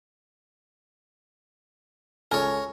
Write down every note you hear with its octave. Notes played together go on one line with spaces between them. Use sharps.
C#2 A4 A#4 C#5 G#5